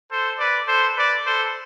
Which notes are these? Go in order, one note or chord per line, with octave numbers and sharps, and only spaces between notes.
A4 C5
B4 D5
A4 C5
B4 D5
A4 C5